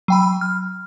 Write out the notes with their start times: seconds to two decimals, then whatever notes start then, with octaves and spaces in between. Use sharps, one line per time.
0.08 F#3 G5 B5
0.41 F6